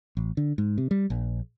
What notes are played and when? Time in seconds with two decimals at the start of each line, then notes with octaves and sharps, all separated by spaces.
0.17 A1
0.37 D3
0.58 G#2
0.78 C3
0.91 G3
1.10 A#1